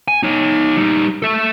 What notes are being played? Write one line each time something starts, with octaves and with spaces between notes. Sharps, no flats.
G#5
D#4 C#5
G3 D#4
A4 E5